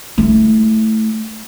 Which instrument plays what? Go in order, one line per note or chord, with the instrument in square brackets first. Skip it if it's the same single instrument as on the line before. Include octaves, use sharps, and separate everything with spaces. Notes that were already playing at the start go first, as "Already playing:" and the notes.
[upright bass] A3 E4